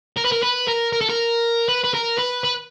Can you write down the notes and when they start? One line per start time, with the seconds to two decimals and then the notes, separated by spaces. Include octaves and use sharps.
0.17 A#4
0.25 B4
0.32 A#4
0.43 B4
0.68 A#4
0.93 A#4
1.01 A4
1.09 A#4
1.69 B4
1.84 B4
1.94 A#4
2.19 B4
2.44 B4